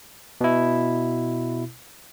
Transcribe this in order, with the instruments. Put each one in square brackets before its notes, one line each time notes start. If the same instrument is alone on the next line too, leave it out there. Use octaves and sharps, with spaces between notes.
[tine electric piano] B2 E4